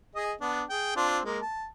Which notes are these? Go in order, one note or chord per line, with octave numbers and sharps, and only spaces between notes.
G#4 D#5
B3 D4
G#4 G5
C4 D4 F4
G#3 A#3
A5